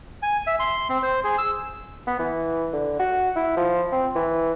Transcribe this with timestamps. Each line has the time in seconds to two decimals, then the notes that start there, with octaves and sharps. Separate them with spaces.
0.23 G#5
0.47 E5
0.60 C6
0.90 C4
1.03 C5
1.24 G#4
1.38 E6
2.07 B3
2.19 E3
2.73 D3
2.99 F#4
3.36 E4
3.57 F3
3.92 C4
4.16 E3